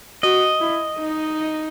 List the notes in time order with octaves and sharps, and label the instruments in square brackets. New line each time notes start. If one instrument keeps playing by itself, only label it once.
[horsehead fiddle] F#4 [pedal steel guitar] D#5
[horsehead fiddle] E4
D#4